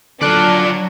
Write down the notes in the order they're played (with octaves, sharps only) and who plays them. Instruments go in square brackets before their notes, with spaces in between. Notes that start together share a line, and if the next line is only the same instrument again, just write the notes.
[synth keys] D3 F#6 [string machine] F#3 [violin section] D4 [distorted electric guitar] F4 D5